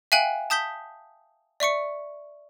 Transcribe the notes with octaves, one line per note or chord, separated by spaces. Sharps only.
E5 F5 G5 G#5 F#6 F#7
A5 D#6 G6 B6 G7
D5 E5 C#6 C#7